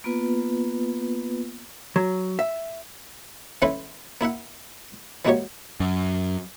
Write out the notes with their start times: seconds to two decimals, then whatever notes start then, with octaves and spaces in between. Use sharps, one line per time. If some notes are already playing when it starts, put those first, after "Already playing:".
0.04 A#3 B3 F4 B4
1.96 F#3
2.39 E5
3.62 E3 A3 C#4 E4 B4 C6
4.21 A#3 E4 E5 F#5
5.25 E3 G#3 A#3 F#4 G4 C#5
5.80 F#2